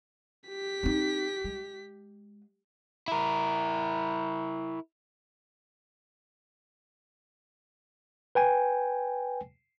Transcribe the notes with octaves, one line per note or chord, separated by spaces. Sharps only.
G4 B6
C4 D#4
G#3
E4 A#4
B4 G5 G#5